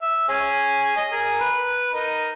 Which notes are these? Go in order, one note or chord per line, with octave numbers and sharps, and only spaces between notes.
E5
C#4 G#4
D#5
G#4 A#4
B4
D#4 A#4